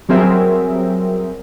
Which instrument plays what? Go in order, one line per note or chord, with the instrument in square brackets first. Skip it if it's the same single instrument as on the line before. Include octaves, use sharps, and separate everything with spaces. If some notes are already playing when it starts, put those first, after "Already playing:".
[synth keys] F#3 G3 C4 G#4 A#4 E5